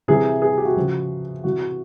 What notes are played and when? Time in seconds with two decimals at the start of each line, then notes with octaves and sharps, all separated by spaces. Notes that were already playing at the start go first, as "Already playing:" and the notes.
0.08 C3 E3 G#4
0.42 G#4
0.58 G4
0.65 F#4
0.77 C#3 F3
1.44 C3 E3 F#4